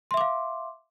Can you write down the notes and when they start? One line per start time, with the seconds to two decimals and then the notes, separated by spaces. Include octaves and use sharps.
0.11 C6
0.14 E5
0.17 D6
0.21 F5